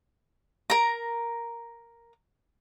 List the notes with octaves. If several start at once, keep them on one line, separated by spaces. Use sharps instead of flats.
A#4 A#5